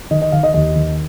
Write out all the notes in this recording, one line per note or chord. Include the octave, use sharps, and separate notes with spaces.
D#3 D#5
D#5
D#3 F5
D#5
D#2 D#5
D#3